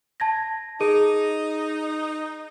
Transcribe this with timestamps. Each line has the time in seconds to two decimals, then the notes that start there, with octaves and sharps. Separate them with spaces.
0.20 A5 G#6 A#6
0.81 D#4 G#4 D#7